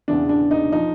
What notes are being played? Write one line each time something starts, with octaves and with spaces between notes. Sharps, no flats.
E2 C#3 E3 D4
D4
D#4
F3 D#4